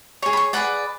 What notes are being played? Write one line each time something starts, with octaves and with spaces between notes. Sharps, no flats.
G#4 C#5 C#6
B5
C#6
G#4 B4 D5 F#5